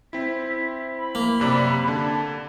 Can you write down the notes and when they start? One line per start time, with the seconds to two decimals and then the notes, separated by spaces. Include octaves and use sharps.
0.13 C4 E4 B6
0.97 B5
1.15 A#3
1.40 F#2 C3 D5
1.88 D3 A5